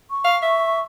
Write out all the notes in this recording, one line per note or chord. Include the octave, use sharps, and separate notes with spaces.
C#6
F5
E5